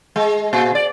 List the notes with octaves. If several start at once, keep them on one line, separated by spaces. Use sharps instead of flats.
G#3
A#2
D5